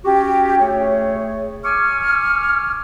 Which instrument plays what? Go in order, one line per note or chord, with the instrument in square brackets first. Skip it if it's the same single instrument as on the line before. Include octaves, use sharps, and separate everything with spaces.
[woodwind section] C#4 F#4 G4
A3 G#4 C#5
G#5 C#6 D6 F6